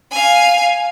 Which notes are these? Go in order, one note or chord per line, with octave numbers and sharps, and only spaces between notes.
F5 G#5